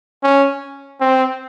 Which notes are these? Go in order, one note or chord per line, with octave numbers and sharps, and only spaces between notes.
C#4
C4